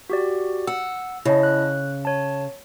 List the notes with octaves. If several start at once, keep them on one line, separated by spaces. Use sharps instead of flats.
F#4 G4 D5
F#5 E6
C#3 E4 D#5 A5
F#6
C#5 A5